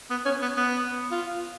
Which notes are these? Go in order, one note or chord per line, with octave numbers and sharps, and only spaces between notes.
B3
C#4
B3
B3
F4